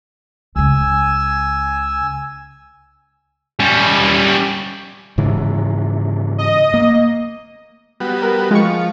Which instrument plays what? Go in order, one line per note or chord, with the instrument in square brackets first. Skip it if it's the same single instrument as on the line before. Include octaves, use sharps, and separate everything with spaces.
[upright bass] C#2 C#3 [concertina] G#5 E6
[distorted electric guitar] G3 C#4
[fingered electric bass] G#2 C#3 E3
[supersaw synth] D#5
[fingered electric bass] A#3
[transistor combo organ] G3 B3 F#4
[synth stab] A#4
[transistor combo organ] F3 [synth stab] G#3 C#6